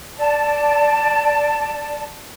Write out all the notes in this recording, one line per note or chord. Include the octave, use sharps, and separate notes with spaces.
D5 A5